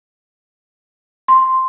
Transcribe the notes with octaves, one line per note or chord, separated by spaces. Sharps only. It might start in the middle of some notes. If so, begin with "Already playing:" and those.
C6